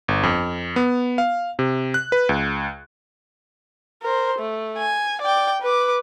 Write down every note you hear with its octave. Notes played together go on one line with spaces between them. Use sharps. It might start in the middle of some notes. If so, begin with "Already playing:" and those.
G1
F2
B3
F5
C3
F#6
B4
C#2
A#4 C5
A3
G#5
D5 G5
B4 D6